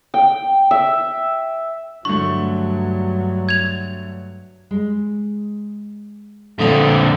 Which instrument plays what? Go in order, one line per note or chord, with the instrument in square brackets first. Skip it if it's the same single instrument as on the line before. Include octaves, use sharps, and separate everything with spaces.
[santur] G5
E5
[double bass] G2 F#3 [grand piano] D3 A3 [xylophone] C#6
[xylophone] G#6 F7
[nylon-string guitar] G#3
[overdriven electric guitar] A#2 D3 [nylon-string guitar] F3 C4 F4 [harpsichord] A3 D#4 F5